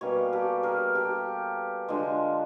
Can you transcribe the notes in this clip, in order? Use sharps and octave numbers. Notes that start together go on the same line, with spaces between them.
B2 G3 A#3 C#4 B4 C#5
G4 A4
G#4 A#4
G4 A4
D3 F3 G#3